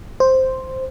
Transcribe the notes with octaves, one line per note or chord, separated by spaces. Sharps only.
C5